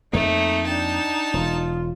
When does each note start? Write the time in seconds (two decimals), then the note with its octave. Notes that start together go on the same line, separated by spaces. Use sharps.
0.13 F2 A3 A#3 D#4
0.67 D4 G5 A5
1.34 E1 F4